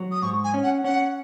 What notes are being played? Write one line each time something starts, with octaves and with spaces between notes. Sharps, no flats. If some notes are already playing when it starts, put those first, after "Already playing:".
Already playing: F#3
D#6
G#2 C#6
G#5
C#4
F#5
C#4 F#5